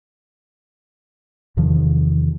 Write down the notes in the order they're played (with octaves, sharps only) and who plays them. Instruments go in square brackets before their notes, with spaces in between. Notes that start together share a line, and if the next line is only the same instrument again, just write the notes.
[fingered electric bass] E2 C3 D#3 F3